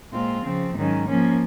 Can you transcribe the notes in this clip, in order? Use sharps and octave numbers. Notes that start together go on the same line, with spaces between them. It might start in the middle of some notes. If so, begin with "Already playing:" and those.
A#2 G#3 C4 F4
C#3 F3 C4
G#2 D#3 F#3 C#4
F3 A#3 C#4